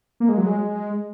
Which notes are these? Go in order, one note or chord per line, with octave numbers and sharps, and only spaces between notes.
A#3
G#3
F#3
G#3